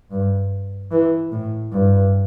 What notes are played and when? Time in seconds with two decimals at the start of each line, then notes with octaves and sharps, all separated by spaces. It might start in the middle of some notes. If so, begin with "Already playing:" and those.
0.11 G2
0.91 E3
1.31 A2
1.72 G2